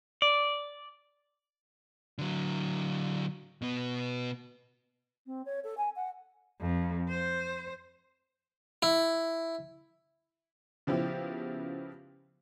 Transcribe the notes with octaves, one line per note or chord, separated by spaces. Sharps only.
D5
D3 F#3
B2 B3
C4
C#5
A4
G#5
F#5
F2
C5
E4
C#3 F3 B3 E4 G4